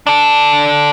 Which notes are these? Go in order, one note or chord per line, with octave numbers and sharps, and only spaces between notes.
D4 A4